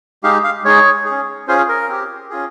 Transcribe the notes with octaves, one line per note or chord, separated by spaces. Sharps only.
G#3 D#4 G4 F5
F5
G#3 D#4 G#4 C#5
G#4
C#4
C#4 F4 G#4 C5
A#4
C4 G4
C#4 F4 G#4